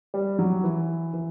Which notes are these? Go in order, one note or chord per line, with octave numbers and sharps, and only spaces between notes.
G3
F#3
E3
E3